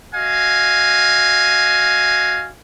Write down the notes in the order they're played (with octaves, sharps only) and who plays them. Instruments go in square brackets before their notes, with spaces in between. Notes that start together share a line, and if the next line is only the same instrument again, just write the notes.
[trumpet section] F#4 D#5 F5 G#5